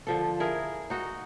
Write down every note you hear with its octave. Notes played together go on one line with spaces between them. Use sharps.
D3 F3 A4
E4 G#4 A#4
D#4 F#4 D#5